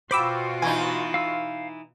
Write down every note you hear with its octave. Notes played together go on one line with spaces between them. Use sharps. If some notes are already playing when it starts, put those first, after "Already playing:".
B2 F4 F#4 C5 G5 B5 D6 E6
E3 D#4 G#5
F5 E6